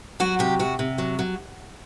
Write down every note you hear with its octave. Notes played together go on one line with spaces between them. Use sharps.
F#3 F#4
C3 G4
C3 F#4
C3
F#3
F#3